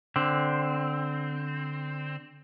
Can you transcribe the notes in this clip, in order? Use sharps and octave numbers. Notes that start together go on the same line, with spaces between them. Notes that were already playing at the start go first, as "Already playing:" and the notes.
D3 C4